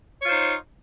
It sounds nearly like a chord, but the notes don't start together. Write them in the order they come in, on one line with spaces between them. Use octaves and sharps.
C#5 F4 C5 D#4